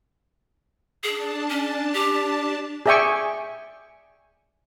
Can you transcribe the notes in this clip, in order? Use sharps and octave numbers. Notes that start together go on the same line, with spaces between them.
D4 G#4 A5
C#4
G4
G#4 D5 E5 G5 G#5 C#6